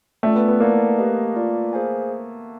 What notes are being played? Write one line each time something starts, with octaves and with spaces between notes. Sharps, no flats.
A3 C#4 F4 A4 D5 G5
B3
B3
A#3 E4 A4 D5 F#5 A5
G4 B4 D#5
F4 A#4 D5
G#4 C5 F5 G#5